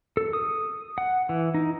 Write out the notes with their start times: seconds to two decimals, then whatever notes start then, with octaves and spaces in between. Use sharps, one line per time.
0.17 A4
0.33 D#6
0.98 F#5
1.29 E3
1.54 D#4